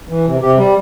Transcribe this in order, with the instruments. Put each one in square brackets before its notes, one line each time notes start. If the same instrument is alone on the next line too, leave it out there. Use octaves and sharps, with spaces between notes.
[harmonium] E3
C3
C3 G4
G3